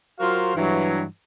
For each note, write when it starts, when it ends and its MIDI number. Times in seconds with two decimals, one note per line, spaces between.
0.20 0.54 54
0.20 0.54 65
0.20 0.54 66
0.20 0.54 70
0.20 0.54 72
0.20 0.54 77
0.55 1.03 43
0.55 1.03 52
0.55 1.03 54